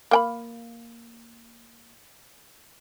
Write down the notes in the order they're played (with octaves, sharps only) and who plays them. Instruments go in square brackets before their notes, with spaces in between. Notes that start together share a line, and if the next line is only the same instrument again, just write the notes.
[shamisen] A#3 G5 B5